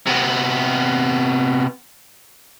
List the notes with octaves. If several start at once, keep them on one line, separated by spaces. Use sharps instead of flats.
C3 B3